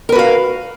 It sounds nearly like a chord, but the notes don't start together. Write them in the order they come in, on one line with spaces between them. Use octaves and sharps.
A#4 B4 F#4 F5